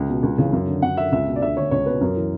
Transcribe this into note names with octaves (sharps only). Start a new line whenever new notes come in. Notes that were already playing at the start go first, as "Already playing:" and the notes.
Already playing: C#2
B2
C#2
C#3 E3
F#2
D3
F#2 F#5
D3 E5
C#2 E5
B2
D5
D2 E5
D3 C#5
C#2 C#5
B2 B4
F#2 A#4
E3